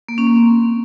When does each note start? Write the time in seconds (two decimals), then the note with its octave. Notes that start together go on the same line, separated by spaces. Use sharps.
0.09 A#3
0.18 C#4
0.27 A#3
0.37 C4